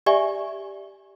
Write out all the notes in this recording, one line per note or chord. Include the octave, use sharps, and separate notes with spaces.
G4 D5 E5 G#5 C#6